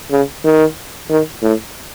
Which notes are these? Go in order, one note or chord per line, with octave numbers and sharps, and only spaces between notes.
C#3
D#3
D#3
A2